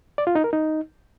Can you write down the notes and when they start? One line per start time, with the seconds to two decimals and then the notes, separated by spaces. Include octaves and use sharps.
0.18 D5
0.27 F4
0.35 D#4
0.44 A#4
0.53 D#4